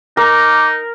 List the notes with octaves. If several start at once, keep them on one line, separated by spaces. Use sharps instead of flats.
D#4 A#4 D6